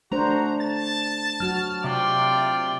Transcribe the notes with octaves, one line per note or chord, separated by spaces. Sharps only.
A3 D4 F#4 C5 A#5
A5 A6
F#3 F#4 F6
C3 F4 D5 G5